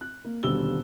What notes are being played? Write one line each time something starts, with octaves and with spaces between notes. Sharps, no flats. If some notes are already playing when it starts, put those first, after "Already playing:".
F#6
A#3
D#1 B1 D3 G3 E6 G7